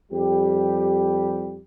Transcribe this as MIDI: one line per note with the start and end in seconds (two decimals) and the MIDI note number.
0.12 1.59 41
0.12 1.59 55
0.12 1.59 67